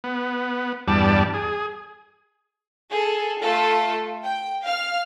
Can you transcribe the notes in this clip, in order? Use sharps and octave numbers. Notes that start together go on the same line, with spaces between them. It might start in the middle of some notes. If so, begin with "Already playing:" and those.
B3
E2 G2 G3 D5 A5
G#4
G#4 A4
A3 F4 A4
G5
F5 F6